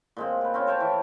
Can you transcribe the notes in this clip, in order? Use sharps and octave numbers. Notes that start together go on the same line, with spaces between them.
A#2 G#3 C4
G4 B4
C4 C#4 F4
C5 C#5 G5 A5
E3